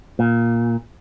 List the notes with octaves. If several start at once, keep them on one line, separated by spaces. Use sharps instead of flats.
A#2